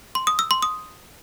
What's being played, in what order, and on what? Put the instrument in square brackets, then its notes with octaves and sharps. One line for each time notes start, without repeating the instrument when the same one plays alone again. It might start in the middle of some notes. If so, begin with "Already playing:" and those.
[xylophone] C6
D#6
E6
C6
D#6